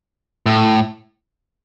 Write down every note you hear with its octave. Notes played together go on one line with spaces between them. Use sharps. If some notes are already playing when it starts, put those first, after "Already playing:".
A2